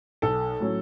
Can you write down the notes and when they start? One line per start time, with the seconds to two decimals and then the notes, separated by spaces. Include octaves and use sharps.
0.22 B1 A4
0.60 A2 F#3 C#4